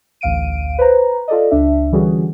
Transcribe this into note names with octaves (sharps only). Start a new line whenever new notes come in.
A1 D2 F5 D7 D#7
B4 C5 A#5
F4 A4 D5 D#5
C#2 D4 E5
D3 E3 G3 C#4 F#4 G#4